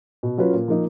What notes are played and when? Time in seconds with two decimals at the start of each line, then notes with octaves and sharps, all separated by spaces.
0.23 B2
0.38 F#3 C#4 F4 B4
0.54 A#2
0.68 F3 A#3 D#4